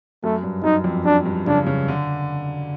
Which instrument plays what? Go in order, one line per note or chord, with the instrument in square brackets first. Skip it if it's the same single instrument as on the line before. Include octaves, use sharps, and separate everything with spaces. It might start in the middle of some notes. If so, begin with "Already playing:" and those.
[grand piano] F#2 [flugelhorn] A3
[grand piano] G2
[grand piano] F#2 [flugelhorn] D#4
[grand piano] F2
[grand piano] F#2 [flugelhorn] D4
[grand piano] G2
[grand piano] C#3 [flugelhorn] D4
[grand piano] C#3
D3